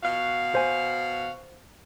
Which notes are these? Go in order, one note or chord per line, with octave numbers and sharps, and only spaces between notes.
B2 F#4 F5
C5 G#5